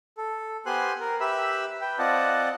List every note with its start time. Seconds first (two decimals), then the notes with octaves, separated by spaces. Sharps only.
0.17 A4
0.66 B3 G4 C5 G#5 C6 F#6
1.00 A#4
1.20 G4 B4 E5 B5 E6
1.81 B4 G5
1.99 C4 F4 D5 D#5 F#5 A5